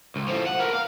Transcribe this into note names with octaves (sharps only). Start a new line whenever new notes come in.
C#2
A2 F3
F#5
A#4 B4
F5